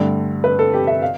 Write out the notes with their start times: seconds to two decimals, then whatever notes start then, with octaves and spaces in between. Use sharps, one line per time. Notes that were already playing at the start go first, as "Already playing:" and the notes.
Already playing: G2 D3 A3
0.44 B4
0.59 A4
0.73 G4
0.87 E5
1.02 F5